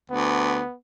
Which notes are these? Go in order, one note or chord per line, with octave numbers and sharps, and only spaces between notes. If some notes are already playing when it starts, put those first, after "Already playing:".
D2 B3